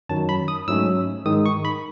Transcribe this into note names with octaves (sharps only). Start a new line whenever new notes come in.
F#2 D#3 F#3 A5
B5
D#6
G#2 F#3 A3 C#4 E6
G#2 D#3 G#3 D#6
C#6
B5